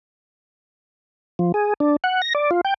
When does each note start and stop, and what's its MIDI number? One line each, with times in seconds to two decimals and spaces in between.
1.39 1.52 53
1.54 1.74 68
1.80 1.96 62
2.04 2.22 78
2.22 2.33 94
2.35 2.51 74
2.51 2.61 65
2.65 2.74 79